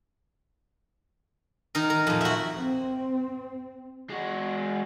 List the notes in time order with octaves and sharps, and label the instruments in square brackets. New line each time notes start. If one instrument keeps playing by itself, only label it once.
[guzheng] D#3 D#4 A#4
A#4
F2 A#2
F#4 E5
[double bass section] C4
[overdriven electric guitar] G#3 F#4